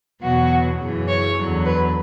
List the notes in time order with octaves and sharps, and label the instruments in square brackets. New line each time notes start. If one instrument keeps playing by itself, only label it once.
[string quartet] E2 B2 F#3 F#4
F#2 C#3 E3
C#5
E2 D3 F#3
B4